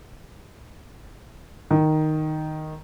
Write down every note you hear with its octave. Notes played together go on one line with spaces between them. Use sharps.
D#3